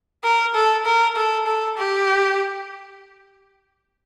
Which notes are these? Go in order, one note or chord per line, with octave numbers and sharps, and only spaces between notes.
A#4
A4
A#4
A4
A4
G4